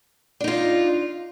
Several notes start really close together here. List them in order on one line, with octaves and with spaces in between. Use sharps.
D4 D#4 F4